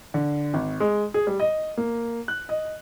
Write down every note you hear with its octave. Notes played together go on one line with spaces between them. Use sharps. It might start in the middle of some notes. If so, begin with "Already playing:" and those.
D3
G#1
G#3
G#4
G3
D#5
A#3
F#6
D#5